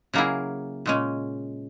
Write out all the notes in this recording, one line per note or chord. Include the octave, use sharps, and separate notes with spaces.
C#3 F#3 A#3 E4 G#4
A#2 G#3 C#4